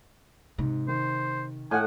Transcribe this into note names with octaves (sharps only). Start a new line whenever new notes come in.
G#2 C3
D#3 C5
A2 F#5 G#5